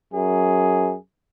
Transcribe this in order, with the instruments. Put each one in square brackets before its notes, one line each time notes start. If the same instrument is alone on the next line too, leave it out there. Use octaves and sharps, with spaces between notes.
[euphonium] F#2 [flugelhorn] G#4